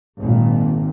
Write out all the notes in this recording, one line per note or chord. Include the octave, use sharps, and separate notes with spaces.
G#1 A#2